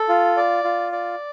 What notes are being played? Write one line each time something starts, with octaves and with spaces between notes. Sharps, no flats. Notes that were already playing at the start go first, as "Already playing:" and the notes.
Already playing: A4
F4
D5
F4
D5